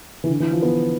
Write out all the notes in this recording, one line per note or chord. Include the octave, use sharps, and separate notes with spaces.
E3
D3
E3
F3
B3